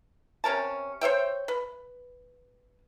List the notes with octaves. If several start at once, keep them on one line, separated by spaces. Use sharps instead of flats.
C3 C#4 A#4 A5
C5 C#5 E5 G5
B4